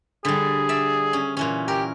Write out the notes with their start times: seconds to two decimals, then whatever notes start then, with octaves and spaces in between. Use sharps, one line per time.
0.25 D3 G3 G#4
0.69 D5 E5
1.13 C#4
1.37 A#2 E3 C#4
1.68 G4 A#4